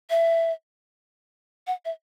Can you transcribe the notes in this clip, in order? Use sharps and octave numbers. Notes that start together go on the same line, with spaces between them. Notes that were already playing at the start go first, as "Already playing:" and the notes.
E5
F#5
E5